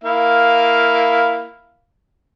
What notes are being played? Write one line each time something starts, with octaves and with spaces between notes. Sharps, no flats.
A#3 E4 F5